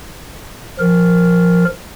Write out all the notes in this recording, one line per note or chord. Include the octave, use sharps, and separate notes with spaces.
F3 A#4